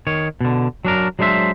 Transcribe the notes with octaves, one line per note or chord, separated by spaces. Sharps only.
D#3 C#5
B2 D3
F#3 D4 A#4
F#3 G#3 D4 C5 E5